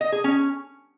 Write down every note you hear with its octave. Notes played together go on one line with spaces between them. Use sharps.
D#5
G#4
C#4